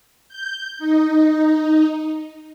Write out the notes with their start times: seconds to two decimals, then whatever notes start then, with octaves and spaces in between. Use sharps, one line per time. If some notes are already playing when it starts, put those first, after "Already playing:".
0.29 G6
0.78 D#4